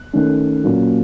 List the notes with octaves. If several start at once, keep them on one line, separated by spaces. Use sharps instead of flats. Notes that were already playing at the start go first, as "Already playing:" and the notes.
Already playing: F#6
D#3 A3 C#4
A#2 F#3 A#3 C#4